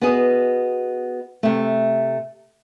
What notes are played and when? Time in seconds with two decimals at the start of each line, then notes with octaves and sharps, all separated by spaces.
0.01 B3 F#4 G#4 D#5
1.43 C3 A3